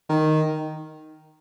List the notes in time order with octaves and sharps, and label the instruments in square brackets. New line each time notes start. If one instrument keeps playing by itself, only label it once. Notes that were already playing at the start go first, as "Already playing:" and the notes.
[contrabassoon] D#3